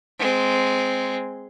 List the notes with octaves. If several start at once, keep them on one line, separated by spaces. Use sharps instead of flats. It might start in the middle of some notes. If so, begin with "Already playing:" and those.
G#3 C4